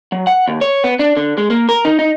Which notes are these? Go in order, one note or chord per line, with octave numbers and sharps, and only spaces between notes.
F#3
F#5
D#2
C#5
B3
D4
D3
G#3
A#3
A#4
D#4
D#4